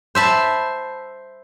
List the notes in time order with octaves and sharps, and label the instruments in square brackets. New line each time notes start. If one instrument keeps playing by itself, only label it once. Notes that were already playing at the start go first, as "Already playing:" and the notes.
[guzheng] C5 E5 A5 B5